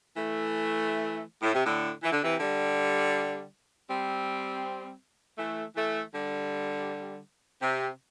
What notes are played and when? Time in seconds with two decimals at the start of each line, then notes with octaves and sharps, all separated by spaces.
0.17 E3 A3
1.42 A2
1.54 C3
1.65 A2 D3
2.03 E3
2.12 D3
2.22 C3 E3
2.40 D3 G3
3.89 G3 C4
5.38 E3 A3
5.76 E3 A3
6.13 D3 G3
7.62 C3